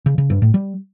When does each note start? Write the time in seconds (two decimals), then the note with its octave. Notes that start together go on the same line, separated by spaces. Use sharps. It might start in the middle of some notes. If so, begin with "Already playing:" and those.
0.06 C#3
0.18 C#3
0.30 G2
0.42 A2
0.54 G3